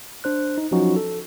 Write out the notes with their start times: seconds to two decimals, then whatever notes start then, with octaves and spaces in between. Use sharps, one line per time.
0.24 D4 C5 F#6
0.58 D#4
0.72 F3 F#3 C#4 D#4 F4 F#4
0.96 A4